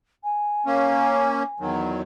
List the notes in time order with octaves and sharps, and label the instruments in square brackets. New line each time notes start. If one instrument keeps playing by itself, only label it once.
[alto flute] G#5
[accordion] A#3 C#4
E2 D#3 F#3